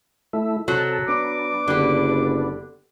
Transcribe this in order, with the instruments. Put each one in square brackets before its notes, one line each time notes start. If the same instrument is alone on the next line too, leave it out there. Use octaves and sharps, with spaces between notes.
[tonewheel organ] A3 E4
[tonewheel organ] C3 A4 [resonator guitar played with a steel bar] F#3
[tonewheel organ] B3 D4 [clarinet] D6
[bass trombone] F#1 [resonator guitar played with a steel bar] D3 G4